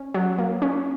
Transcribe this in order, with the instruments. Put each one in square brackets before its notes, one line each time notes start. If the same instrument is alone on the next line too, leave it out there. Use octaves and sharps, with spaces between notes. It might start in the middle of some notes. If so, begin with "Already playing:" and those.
Already playing: [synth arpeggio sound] C#4
F#3
A#3
C#4